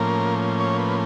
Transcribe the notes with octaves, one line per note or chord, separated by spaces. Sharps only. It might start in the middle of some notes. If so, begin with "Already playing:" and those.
Already playing: A2 F3 A#3 C#4 A#4
C#5
B4